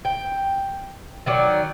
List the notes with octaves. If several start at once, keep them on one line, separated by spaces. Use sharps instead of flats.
G5
D#3 F#3 D5